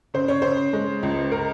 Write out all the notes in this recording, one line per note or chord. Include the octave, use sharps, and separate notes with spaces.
C#3 C5
C#5
C#3 C5
G#3
C#2
A#4